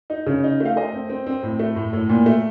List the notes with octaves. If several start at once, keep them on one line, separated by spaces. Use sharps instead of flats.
D#4
C#3
D#4
A3
F5
A3 D#5
C4
C4
C4
A2
A3
A2
A2
A#2
A3